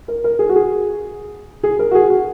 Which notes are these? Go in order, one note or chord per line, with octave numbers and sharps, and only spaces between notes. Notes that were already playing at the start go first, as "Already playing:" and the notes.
A#4
A#4
G#4
F#4
G#4
G#4
A#4
F#4
G#4
F#4